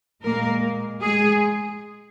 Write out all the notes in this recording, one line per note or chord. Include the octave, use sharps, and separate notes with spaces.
A#2 G#3 A#3 A#4
G#3 G#4